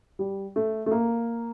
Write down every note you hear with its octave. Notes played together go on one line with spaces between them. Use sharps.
G3
A3
A3
A#3